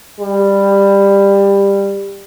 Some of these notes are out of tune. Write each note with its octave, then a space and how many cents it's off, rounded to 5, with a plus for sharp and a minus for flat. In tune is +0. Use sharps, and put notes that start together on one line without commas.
G3 +15